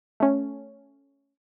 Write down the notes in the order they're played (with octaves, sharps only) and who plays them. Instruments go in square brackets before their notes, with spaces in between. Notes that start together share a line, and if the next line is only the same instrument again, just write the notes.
[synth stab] A3 C#4